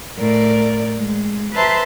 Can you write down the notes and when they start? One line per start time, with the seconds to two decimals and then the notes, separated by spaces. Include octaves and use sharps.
0.16 A2 A#4 D5
0.98 G#3
1.54 B4 C5 E5 A5 A#5 C6